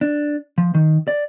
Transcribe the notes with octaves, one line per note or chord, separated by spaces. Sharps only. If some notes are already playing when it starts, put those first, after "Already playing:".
D4
F3
D#3
D5